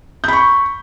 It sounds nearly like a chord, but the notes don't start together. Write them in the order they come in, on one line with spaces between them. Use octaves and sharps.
G6 B5 C#6